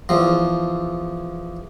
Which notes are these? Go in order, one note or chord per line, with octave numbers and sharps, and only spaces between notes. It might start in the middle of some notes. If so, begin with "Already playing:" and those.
E2 F3